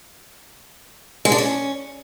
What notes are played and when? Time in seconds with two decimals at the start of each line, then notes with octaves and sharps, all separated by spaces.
1.25 G#3
1.32 D4
1.38 C#4